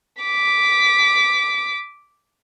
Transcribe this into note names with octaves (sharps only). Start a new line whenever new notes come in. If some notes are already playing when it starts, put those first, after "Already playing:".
D6 B6